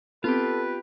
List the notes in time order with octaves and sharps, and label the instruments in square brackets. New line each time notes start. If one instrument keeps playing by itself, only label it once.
[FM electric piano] B3 C4 [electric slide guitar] F4 G4 [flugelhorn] A4 [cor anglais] B4